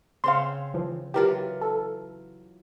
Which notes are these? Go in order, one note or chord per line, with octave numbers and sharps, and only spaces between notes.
C#3 C4 C#5 F5 C6
E3 F3
E3 F#3 F4 G4 A#4
A4